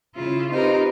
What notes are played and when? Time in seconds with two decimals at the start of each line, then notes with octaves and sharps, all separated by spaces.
0.16 C#3 E4 F4
0.51 C4 D#4 F4 G4 A#4 B4